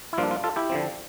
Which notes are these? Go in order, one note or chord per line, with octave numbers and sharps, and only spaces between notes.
E4
G2 F3 A#3 D4 F4
F4
F4 A4
E4 G4
D3 F3 C4